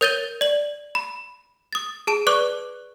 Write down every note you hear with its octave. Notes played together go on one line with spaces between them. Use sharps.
A#4 C#5 G6 A6 D#7 G7
D5 F#7
B5
D#6 A6
G#4 A5 D7 E7
B4 D5 C#6 D6 F#6